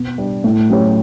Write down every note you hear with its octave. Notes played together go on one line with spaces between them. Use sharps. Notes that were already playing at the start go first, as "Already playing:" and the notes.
Already playing: B2
G3 D4
A2
F#3 C#4 G4 C#5